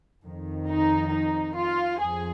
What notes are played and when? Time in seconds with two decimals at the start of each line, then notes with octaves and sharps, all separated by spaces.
0.24 F2 D#3
0.67 D#4
1.11 D#4
1.55 F4
1.99 F2 F3 G#4